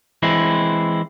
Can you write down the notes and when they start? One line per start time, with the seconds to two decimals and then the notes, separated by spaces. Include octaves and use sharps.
0.23 E3 G#3 C4 E4